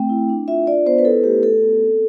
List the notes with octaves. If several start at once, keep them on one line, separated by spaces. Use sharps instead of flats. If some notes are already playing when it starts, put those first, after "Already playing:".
Already playing: A3 C4 G5
E4
D4
F4 E5
F4 D5
B3 C5
B4
E4 A4
A3 G4
F4 A4
B3
C4